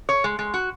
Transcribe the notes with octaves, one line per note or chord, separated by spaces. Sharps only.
C#5
G#3
G#3
F#4